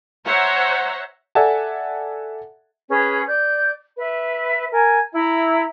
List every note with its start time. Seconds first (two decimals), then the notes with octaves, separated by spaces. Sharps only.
0.24 C5 C#5 E5 F#5 A#5
1.35 A4 D5 E5 F#5 G#5 A5
2.89 C#4 G#4 B4
3.27 D5 G6
3.97 B4 E5
4.71 A#4 G#5
5.13 E4 E5 A#5